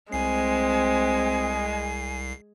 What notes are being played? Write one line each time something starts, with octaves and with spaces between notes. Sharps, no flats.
C2 G#3 C4 G#5 C7